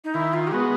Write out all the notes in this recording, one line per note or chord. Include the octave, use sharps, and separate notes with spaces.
D#4
D#3 E4
F4
G4
G#3 B3 F#4